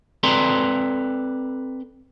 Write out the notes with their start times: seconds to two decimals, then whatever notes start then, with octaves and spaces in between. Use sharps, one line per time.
0.23 C4 A4 B4 D5 A#5 C6